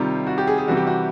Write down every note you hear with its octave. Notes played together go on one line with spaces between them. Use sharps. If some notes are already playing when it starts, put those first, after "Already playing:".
Already playing: C3 D#3 G3 F4
F#4
G4
G#4
G#4
C3 E3 G3 F#4
G4
F#4